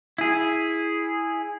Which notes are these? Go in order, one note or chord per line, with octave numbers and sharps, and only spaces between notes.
E4 G#4